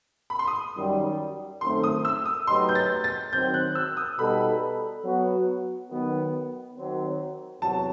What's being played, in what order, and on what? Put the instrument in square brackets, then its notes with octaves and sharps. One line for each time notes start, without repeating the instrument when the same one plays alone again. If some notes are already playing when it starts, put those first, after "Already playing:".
[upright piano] B5
C6
D#6
[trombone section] F#2 D#3 G3
[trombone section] F#2 D#3 A3 C4 [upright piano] C6
[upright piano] D#6
E6
D#6
[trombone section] F#3 A3 D#4 G4 B4 [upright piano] C6
[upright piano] G6
A6
A6
[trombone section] D#3 F#3 C4 [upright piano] G6
[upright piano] F#6
E6
D#6
[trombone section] B2 G3 D#4 A4 [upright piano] B5
[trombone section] F#3 B3 F#4
D#3 F#3 B3
D#3 F#3 C4
[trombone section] E2 C3 F#3 [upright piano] A5